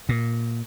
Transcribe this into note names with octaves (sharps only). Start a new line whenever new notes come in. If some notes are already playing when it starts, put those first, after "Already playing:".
A#2